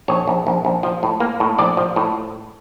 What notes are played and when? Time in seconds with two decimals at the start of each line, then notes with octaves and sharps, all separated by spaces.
0.08 A#1 C#5
0.27 A#1
0.47 A#1
0.65 A#1
0.83 F3
1.03 A2
1.20 A#3
1.40 A2
1.58 A#1 D5
1.77 F3
1.96 A2